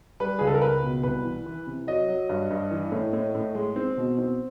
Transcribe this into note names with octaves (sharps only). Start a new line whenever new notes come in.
G3 B4
C#2 G#4
A4
A#4
C#2 B4
B2
C2 B4
E3
E3
C3
F#3 D#5
F#3
G2
G2
E3
A2
A2
A2
G#3
C4
B2
C4